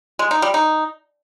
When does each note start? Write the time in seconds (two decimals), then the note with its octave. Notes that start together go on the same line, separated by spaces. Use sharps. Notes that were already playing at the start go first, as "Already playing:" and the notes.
0.19 G#3
0.31 D#4
0.42 G3
0.54 D#4